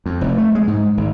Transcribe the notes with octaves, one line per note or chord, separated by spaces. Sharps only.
F2
F1
A3
G#3
G#2
G#1